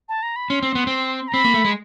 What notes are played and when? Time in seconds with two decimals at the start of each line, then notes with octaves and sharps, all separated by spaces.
0.09 A5
0.23 A#5
0.36 B5
0.50 C#4 C6
0.63 C4
0.75 B3
0.87 C4
1.28 A#5
1.33 C4 B5
1.44 A#3
1.54 A3
1.64 G#3